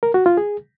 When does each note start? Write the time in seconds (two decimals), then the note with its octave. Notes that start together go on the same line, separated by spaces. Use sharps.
0.03 A#4
0.14 F#4
0.26 F4
0.37 G#4